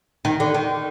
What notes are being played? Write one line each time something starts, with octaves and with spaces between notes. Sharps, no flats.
D#3
D3
D#3